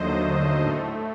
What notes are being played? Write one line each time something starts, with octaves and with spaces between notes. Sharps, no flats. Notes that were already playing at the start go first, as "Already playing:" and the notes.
Already playing: D#2 D3 F#3 A3 C5 D#5
A2 A3